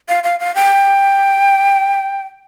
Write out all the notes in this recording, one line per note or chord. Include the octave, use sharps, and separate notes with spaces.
F5
F5
F5
G5